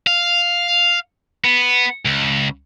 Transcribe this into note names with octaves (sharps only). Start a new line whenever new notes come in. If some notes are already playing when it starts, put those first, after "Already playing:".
F5
B3
C#2